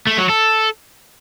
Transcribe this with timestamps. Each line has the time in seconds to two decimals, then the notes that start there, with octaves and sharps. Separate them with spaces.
0.07 A3
0.18 F#3
0.30 A4